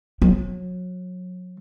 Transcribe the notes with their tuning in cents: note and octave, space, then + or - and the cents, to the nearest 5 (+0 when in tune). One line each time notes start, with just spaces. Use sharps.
F#3 -30